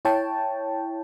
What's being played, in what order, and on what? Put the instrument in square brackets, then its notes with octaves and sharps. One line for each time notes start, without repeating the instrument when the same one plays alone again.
[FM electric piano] E4 C#5 G5 A5